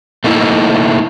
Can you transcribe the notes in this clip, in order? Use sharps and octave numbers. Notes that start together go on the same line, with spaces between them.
A3 A#3 D#4 E4